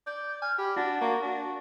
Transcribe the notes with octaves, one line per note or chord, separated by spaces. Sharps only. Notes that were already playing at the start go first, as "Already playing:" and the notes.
D5 G6
G#5 F6
G4 B5
D4 F#4 A6
A#3 C#6
D4